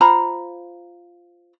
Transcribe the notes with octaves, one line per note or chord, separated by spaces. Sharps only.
F4 C5 A#5 B5